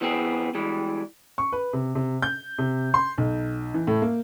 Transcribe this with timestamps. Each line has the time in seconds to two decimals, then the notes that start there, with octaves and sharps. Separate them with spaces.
0.01 E3 B3 C4 G#4
0.55 E3 G3 G#3
1.38 C#6
1.52 B4
1.73 C3
1.95 C3
2.22 G6
2.58 C3
2.94 C6
3.18 B1
3.74 E3
3.87 A2
4.02 A#3